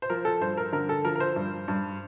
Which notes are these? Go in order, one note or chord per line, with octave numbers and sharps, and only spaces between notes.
C5
F3 A#4
A4
G2 C5
A#4
D3 A#4
A4
F3 A#4
A#4
C5
G2
G2